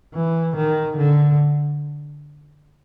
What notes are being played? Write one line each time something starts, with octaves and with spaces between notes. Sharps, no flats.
E3
D#3
D3